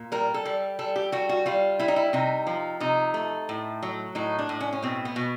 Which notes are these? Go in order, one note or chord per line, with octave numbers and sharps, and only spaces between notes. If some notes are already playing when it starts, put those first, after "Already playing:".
Already playing: A#2
G3 A#4
A4
G3
G3 A4
G4
G3 F#4
F#4
G3 F4
G3 E4
D#4
E4
C3 D#4
F3
C3 D#4
A3
A2
F#3
A2 D#4
D4
A2
C#4
C#4
B2 C4
B3
B2